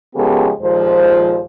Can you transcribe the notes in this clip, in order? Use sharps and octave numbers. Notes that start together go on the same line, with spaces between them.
C#3 F3 G#3 B3 G4 A4
D#2 A#2 F3 G#3 C5